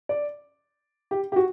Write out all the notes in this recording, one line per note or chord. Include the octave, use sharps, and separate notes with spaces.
D5
G4
G4
F#4